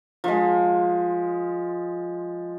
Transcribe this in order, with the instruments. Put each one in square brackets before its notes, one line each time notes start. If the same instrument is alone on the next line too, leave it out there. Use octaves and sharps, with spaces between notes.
[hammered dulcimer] F3 G#3